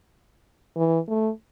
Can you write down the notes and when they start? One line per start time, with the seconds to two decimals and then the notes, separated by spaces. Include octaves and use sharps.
0.77 E3
1.08 A3